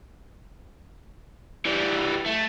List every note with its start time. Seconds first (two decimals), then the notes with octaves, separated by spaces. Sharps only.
1.65 E3 G3
2.26 A3